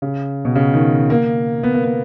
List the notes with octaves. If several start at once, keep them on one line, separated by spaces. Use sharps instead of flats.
C#3
B2
C#3
D#3
A#3
B3
A#3
B3